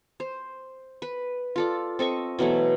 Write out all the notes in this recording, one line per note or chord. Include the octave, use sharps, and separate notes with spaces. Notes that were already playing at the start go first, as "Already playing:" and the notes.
C5
B4
F4 A4 D5
C4 A4 D#5 C#6
B2 E3 F#3 A3